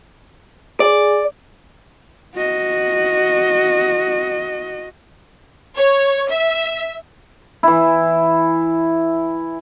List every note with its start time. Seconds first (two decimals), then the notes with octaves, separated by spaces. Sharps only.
0.80 G#4 D5
2.34 F#4 D#5
5.77 C#5
6.30 E5
7.63 E3 E4